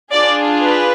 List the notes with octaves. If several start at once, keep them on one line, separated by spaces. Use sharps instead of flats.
D4 F4 G#4 D5
B4